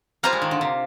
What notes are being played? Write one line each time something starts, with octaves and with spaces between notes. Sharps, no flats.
G3 A#3 F4 C5 F5 A#5
G#3
D#3
D3
C3